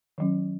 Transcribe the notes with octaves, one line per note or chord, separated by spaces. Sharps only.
D#3 F#3 C#4